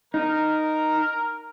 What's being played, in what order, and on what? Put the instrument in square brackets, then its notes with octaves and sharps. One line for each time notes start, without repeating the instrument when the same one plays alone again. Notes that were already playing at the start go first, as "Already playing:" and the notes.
[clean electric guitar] D#4 [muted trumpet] A#4